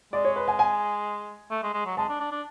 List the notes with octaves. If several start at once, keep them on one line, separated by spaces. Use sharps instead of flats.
G#3 D5
C#5
B4
G#5
G#5
A3
G#3
G#3
F#3
G#3 A5
D4
D4
D4